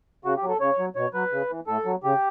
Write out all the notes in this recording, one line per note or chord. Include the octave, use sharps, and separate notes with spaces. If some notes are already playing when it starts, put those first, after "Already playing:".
C#3 F#4
G4
F#3
A4
C#3 C#5
F#3
B2 C#5
F#3 B4
C#3
E3
A2 A4
F#3
C#3 G4